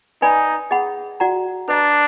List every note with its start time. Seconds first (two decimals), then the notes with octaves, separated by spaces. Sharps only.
0.22 D#4 B4 D5 G#5 B5
0.71 G#4 D#5 F#5 B5
1.20 F#4 D5 F#5 A#5
1.68 D4 B4 D#5 A#5